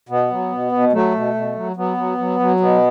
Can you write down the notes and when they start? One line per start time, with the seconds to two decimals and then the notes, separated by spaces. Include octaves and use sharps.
0.09 B2 B3
0.31 F#3
0.52 B2
0.72 B2
0.93 F#3 A3
1.14 B2
1.34 B2
1.55 F#3
1.76 F#3 B3
1.97 F#3
2.18 F#3
2.40 F#3
2.60 B2 B3